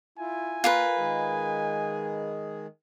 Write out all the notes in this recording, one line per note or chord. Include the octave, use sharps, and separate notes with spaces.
E4 F4 G#5
A#3 F4 A#4 B4 G5
D#3 G#3 G#4